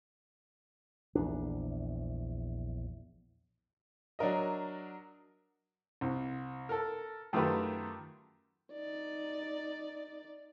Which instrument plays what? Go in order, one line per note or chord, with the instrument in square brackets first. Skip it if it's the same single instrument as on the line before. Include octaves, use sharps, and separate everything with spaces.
[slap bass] A#1 E2 D4
[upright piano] F#3 D4 A#4 D#5
[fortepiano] C2
A4 A#4
F#2 D#3 A3 F4 G4 B4
[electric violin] D#4 D5